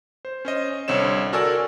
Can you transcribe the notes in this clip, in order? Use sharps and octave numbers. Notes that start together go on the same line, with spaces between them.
C5
C#4 C5 D#5
C2 D3 C4 C#5 E7
F#4 A4 A#4 D5 G#5 E6